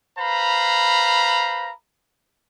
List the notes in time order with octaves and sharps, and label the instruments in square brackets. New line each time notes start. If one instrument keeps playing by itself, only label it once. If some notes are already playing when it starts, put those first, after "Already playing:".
[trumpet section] B4 C5 F5 A#5 B5